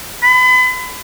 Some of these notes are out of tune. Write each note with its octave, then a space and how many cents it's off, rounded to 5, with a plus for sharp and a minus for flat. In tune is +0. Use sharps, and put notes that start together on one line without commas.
B5 +35